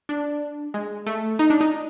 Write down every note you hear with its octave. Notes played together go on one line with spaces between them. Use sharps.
D4
G#3
A3
D#4
D4
D#4